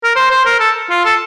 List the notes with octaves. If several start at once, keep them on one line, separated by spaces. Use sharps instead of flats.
A#4
C5
C5
A#4
A4
F4
A4